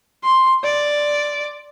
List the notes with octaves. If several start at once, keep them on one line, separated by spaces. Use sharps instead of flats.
C6
D5